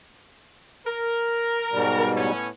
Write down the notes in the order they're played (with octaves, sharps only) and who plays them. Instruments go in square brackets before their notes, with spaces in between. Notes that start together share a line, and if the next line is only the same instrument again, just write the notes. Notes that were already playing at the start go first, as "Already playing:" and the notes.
[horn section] A#4
[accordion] G#2 B2 G3
[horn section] A2 B3 C#4